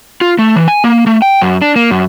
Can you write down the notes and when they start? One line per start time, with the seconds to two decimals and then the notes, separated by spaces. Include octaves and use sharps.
0.21 F4
0.39 A3
0.56 E3
0.68 G#5
0.84 A#3
1.07 A3
1.22 G5
1.41 F#2
1.62 D4
1.76 A#3
1.91 F#2